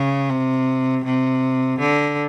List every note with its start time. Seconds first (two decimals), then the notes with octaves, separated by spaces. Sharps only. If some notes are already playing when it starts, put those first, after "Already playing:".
Already playing: C#3
0.30 C3
1.05 C3
1.79 D3